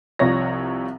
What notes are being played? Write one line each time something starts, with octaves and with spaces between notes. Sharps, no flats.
C2 C3 F3 C#5 A#6